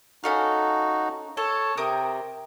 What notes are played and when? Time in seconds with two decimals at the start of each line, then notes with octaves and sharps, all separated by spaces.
0.24 C#4 D#4 F#4 A4 F5
1.37 A4 C#5 A5
1.77 C3 A#4 G5 D#6